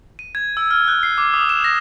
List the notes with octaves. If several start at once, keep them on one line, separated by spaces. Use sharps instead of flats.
D#7
G#6
E6
F6
F#6
C7
D6
D#6
E7
A#6